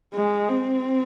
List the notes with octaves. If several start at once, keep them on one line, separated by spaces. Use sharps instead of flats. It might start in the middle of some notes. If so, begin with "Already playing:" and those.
G#3
C4